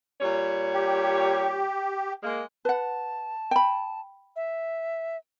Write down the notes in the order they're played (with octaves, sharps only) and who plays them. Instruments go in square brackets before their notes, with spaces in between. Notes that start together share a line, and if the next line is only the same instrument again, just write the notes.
[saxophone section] A#2 G3 C#5
[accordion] G4
[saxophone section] G#3 A#3
[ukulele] B4 F#5 [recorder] A5
[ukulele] G5 B5
[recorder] E5